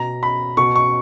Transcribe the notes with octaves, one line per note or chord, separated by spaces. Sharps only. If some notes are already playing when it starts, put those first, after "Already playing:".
Already playing: B2 A#5
B5
B2 C#6
C#6